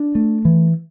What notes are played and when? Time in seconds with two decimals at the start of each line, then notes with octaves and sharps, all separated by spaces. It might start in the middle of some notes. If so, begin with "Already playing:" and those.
Already playing: D4
0.15 A3
0.45 E3